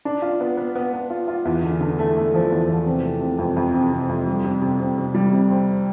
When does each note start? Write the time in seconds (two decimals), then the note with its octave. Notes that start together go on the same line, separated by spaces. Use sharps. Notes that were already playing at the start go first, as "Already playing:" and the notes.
0.05 D4
0.22 F4
0.40 B3
0.57 B3
0.75 B3
0.93 B3
1.10 F4
1.28 F4
1.45 E2
1.63 D3
1.81 D3
1.99 A3
2.15 A3
2.34 F3
2.51 E2
2.69 F3
2.86 C3
3.04 A3
3.21 C3
3.39 F2
3.57 F2
3.74 C3
3.92 C3
4.09 F2
4.27 G3
4.45 C3
4.62 C3
4.80 C3
4.98 C3
5.15 G3
5.33 C3
5.50 C4